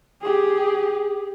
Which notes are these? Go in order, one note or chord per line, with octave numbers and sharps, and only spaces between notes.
G4 G#4